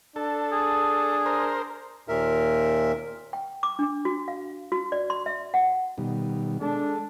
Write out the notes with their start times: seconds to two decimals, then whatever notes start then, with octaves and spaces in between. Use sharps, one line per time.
0.16 D4 A4
0.52 G#4
1.26 A#4 C5
2.08 D#2 A#2 A#4 E5
3.33 G5
3.63 D6
3.79 D4
4.05 F#4
4.28 F5
4.72 F#4
4.92 D5
5.10 C6
5.26 E5
5.54 F#5
5.98 B2 D#3 G3
6.61 G#3 D4 A4